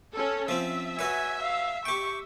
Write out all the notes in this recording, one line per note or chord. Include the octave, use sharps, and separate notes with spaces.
C#4 A4
F3 C4 E5
F#4 B4 C#5 G#5
F5
G4 G5 C#6